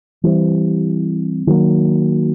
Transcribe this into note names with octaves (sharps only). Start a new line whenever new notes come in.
E3 G3 C4
D#3 F#3 A#3